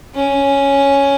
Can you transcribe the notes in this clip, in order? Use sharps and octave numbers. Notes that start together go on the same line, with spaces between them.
C#4